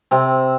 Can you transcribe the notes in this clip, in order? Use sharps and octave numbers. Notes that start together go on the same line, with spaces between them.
C3 C4